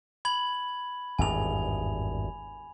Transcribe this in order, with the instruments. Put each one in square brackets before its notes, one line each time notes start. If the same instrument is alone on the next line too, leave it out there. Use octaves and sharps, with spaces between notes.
[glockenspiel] B5 G#6 F#7
[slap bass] G#1 E2 G2 [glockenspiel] G#5 F7